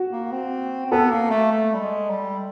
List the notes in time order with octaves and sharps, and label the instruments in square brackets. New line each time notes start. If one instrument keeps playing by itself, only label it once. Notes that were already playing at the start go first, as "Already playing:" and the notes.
Already playing: [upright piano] F#4
[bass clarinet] A#3
C4
C4
[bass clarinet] B3 [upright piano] A4
[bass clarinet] A#3
A3
A3
G3
G#3
G3